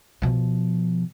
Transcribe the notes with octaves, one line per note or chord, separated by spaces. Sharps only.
B2 F3